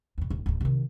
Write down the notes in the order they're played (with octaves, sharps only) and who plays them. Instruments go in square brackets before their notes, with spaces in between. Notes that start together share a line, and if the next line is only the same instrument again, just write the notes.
[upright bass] E2 B2
D#1
D1 A3
C3 D#3